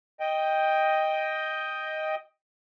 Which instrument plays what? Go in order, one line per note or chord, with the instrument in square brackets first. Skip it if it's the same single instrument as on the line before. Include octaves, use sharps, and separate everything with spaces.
[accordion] D#5 G5